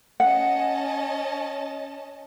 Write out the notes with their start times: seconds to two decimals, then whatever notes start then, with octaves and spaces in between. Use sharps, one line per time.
0.20 C#4 D#5 F#5 A5